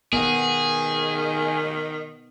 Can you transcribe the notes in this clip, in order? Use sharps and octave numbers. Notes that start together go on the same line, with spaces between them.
D#3 B3 D#4 G#4 F#5